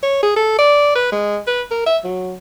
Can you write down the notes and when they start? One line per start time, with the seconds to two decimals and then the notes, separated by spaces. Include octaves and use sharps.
0.03 C#5
0.23 G#4
0.36 A4
0.59 D5
0.95 B4
1.12 G#3
1.47 B4
1.71 A#4
1.86 E5
2.04 F#3